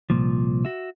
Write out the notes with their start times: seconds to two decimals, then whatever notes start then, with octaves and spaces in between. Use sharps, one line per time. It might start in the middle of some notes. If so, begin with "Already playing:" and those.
0.10 C2 F2 A#2 F3
0.65 F#4 E5